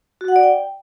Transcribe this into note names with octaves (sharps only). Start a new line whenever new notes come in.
F#4
F#5
D5
G5